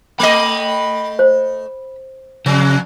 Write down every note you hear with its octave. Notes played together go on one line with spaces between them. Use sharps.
A3 D#5 B5
C5
F2 C#3